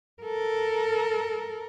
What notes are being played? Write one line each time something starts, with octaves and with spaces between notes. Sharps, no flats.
A4 A#4